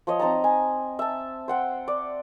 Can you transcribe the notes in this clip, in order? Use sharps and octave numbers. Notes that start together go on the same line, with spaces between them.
F3 C#5 D#5
C4 D#4 A5 A#5
G#5
E5 A5
C5 F#5 G5
D5